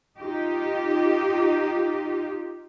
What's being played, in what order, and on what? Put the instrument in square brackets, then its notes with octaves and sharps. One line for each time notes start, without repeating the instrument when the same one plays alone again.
[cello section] D#4 F4 G4